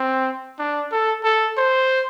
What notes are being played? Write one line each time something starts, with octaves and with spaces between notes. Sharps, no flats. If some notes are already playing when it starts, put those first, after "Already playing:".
Already playing: C4
D4
A4
A4
C5